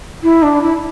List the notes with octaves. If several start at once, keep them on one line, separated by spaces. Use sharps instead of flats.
E4
D4
E4